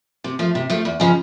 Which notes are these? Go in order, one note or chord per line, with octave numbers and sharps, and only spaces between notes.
C3
F3 A3
C3
F3 A3
E2
C#3 F3 G#3